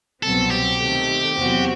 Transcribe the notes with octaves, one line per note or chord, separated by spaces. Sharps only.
C2 B2 F#3 C4 A4
G4
C3 D#3 A3
E2 C3 F#3 C4 F#4